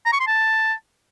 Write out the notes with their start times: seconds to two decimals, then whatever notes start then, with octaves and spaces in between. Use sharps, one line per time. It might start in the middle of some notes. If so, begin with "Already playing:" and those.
0.06 A#5
0.13 C#6
0.20 C6
0.27 A5